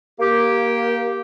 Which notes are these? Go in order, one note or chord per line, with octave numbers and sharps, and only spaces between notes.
A#3 G4